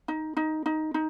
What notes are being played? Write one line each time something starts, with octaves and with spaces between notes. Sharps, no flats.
D#4
D#4
D#4
D#4